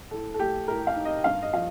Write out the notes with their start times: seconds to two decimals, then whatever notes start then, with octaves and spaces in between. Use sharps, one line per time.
0.11 A2 A4
0.34 A4
0.39 A3 G4
0.68 A2 A#4
0.87 F5
0.96 D#4
1.05 D#5
1.24 G2 F5
1.42 D#5
1.53 F3 F5